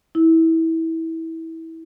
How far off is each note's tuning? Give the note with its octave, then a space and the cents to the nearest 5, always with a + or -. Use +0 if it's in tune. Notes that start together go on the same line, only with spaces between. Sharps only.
E4 -20